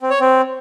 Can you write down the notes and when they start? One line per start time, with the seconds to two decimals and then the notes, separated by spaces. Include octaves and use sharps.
0.01 C4
0.10 C#5
0.20 C4